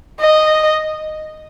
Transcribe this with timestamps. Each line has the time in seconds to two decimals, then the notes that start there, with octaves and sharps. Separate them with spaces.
0.20 D#5